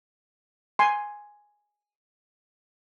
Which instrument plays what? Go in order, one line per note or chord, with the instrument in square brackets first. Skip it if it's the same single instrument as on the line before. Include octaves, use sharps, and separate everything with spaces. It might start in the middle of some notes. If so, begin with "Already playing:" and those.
[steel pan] G#5 C6